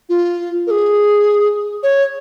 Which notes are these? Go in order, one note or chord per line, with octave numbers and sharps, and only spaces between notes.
F4
A#4
G#4
C#5